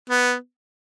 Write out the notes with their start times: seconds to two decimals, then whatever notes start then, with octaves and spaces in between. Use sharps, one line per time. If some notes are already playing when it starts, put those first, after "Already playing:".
0.10 B3